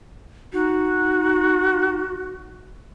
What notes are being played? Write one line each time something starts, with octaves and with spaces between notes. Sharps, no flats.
D#4 F#4